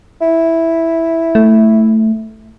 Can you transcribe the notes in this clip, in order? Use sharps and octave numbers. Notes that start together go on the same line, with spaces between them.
E4
A3